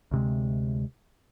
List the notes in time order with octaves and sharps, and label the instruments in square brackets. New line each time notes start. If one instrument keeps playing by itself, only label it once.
[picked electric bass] D2 C3 G#3